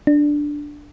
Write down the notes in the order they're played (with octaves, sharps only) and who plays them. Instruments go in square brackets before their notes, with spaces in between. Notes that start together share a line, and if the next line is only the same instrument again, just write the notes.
[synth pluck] D4